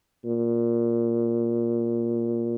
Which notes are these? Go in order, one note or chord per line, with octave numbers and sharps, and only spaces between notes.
A#2